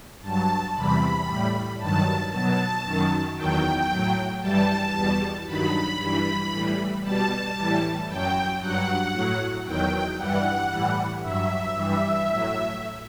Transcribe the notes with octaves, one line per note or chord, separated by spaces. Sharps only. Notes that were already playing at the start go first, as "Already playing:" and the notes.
G2 F#3 A5
E2 C3 E3 G3 B5
A2 G3
G2 D#3 F#3 A5
B2 F#3 A5
F#2 D#3 F#3
E2 D#3 F#3 G5
A2 F#3
G2 E3 G3 A5
E2 B2 G3
G2 D#3 F#3 B5
G2 E3 G3
A2 E3 G3
B2 G3 A5
A2 E3 G3
F#2 F#3 G5
G2 F#3 F#5
A2 F#3
E2 D#3 F#3 G5
G2 E3 G3 F#5
A2 E3 G3
G2 F#3 E5
G2 E3 G3
A2 F#3